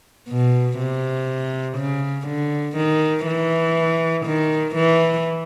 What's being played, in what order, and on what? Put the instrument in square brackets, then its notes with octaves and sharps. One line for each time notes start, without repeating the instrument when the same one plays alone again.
[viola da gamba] B2
C3
C#3
D3
D#3
E3
D#3
E3